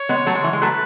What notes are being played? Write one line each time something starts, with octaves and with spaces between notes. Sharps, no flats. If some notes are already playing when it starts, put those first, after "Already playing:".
Already playing: C#5
G#3 B3
F#3 A3
G#3
E3
G#3
F#3 A3 B4